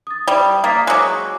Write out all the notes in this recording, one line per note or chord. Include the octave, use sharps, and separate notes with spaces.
D#6 A6
G3
A#3 D#6 A6 B6
F#3 G#3 D6 E6 F#6